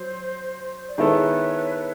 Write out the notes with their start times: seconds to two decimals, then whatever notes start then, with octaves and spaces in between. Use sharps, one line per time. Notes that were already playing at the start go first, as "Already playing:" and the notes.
Already playing: F#3 C5
0.88 D5
0.97 D#3 G#3 B3 E4 A4 B4 C#5